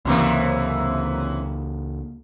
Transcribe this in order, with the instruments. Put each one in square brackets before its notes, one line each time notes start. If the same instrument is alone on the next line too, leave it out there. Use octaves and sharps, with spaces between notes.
[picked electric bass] C#2 A#3 [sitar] F#2 C3 E3